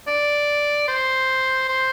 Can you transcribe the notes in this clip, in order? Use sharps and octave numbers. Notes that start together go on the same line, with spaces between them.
D5
C5
C5